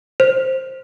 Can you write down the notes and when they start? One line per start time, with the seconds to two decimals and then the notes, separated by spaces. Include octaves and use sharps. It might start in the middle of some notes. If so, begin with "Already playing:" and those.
0.20 C5